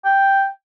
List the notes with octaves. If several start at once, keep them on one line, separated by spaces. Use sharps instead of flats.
G5